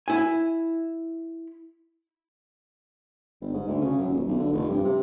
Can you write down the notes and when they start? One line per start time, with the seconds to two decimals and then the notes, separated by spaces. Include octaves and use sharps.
0.08 E4 G#5
3.42 G1
3.54 G#2
3.68 D2
3.81 C#3
3.98 F#2
4.09 D#1
4.28 B1
4.39 D3
4.53 F1
4.69 G2
4.84 C3